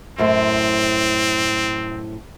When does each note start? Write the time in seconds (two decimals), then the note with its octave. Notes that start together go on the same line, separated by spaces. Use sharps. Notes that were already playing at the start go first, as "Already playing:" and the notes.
0.18 F#2 A2 C4 C5